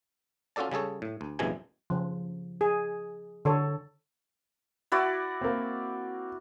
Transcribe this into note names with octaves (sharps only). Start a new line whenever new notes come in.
C#4 F4 F#4 A4 D5 A5
C#3 G3 G#4 A4 C#5
A2
D2
A#1 F#2 C3 E3 G#3 G#5
C#3 F3
G#4
D3 A4 C#5
E4 F#4 D5
A#3 C4